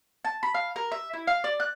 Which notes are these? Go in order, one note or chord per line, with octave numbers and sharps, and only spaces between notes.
A5
B5
F5
A#4
E5
E4
F5
D5
F#6